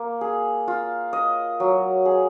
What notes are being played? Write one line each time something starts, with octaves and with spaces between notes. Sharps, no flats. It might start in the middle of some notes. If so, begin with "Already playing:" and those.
Already playing: A#3
G#4
F4
D#5
F#3
G#4